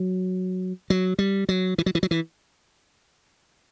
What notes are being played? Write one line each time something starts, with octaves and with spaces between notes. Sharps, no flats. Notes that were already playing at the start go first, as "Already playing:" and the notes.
Already playing: F#3
F#3
G3
F#3
E3
F#3
E3
F#3
E3